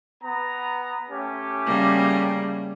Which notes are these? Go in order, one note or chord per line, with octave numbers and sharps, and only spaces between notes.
B3 A#5
A3 C#4 G4
C#3 G3 A#3